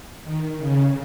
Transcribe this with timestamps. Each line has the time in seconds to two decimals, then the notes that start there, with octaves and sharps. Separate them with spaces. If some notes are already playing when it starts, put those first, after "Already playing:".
0.24 D#3
0.58 C#3